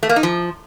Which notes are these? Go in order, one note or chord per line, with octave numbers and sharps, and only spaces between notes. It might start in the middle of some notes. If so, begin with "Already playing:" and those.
A3
A#3
D#4
F3